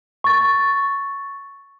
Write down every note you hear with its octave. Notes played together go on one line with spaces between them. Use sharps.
C#6 A6